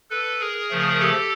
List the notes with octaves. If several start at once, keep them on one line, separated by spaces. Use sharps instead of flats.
A4 B4
G#4 A#4
C#3 F3 A3
G4 A4